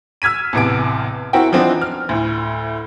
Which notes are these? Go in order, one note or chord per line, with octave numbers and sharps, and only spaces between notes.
E6 F6 G#6 B6 D#7
A1 E2 C3 B3 A5 D7
C4 E4 F#4 A#4 F#5 G5
E3 F3 B3 C4 D4 D#4
F6
D2 A2